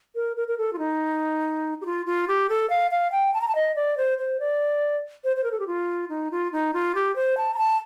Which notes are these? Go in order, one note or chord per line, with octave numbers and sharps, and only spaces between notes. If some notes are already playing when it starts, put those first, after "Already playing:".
A#4
A#4
A#4
A4
F4
D#4
G4
F4
F4
G4
A4
F5
F5
G5
A5
A#5
A5
D#5
D5
C5
C5
D5
C5
C5
A#4
A4
G4
F4
D#4
F4
D#4
F4
G4
C5
A5
A#5
A5